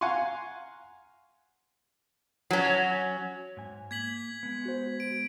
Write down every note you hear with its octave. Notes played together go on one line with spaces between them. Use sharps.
F5 F#5 G#5 A#5 C6 C#6
F#3 C#4
G#2 G#5
A#3 G#6 B6 F#7
G#3 B3
F#4 C5
D7